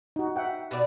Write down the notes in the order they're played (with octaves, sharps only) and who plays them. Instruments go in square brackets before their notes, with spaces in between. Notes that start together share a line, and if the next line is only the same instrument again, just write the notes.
[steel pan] D#4 F#4
E5 F#5 G5
[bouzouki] B2 D5